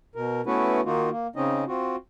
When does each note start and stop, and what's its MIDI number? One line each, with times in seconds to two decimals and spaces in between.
0.15 0.41 47
0.15 0.41 70
0.46 0.81 57
0.46 0.81 59
0.46 0.81 61
0.46 0.81 64
0.46 0.81 66
0.46 0.81 71
0.85 1.10 51
0.85 1.10 58
0.85 1.10 63
0.85 1.10 65
0.85 1.10 66
1.10 1.27 58
1.36 1.64 49
1.36 1.64 60
1.36 1.64 61
1.36 1.64 63
1.36 1.64 75
1.68 1.96 60
1.68 1.96 65
1.68 1.96 66